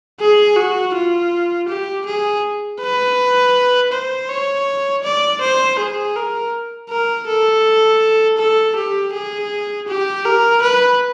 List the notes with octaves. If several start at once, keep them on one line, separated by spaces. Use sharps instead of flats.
G#4
F#4
F4
G4
G#4
B4
C5
C#5
D5
C5
G#4
A#4
A#4
A4
A4
G4
G#4
G4
A#4
B4